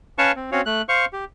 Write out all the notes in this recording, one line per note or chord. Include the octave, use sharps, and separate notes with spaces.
C#4 B4 C#5 F5 A5 C#6
C4
C4 C#4 F#4 C#5 F5
A3 F#6
C5 F5 C#6
G4